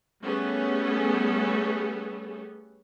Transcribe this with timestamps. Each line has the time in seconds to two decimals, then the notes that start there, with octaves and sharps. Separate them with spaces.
0.22 G3 A3 B3 C#4 G#4 A4